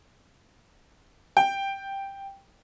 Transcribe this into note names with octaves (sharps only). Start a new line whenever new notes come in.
G5